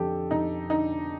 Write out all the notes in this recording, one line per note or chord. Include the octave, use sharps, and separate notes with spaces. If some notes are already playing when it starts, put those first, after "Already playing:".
Already playing: F2 D3 G4 A4
F2 D#4
D3 D#4